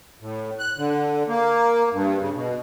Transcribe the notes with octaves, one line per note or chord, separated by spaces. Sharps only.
A2
F#6
D3
A#3
G2
C#3
B2